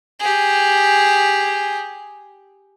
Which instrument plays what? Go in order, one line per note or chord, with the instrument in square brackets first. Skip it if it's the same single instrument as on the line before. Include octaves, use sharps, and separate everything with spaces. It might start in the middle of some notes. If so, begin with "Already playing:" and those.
[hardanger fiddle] G4 G#4